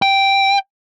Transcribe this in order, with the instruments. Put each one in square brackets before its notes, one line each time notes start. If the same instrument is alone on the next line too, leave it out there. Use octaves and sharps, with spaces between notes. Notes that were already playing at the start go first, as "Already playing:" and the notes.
[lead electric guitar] G5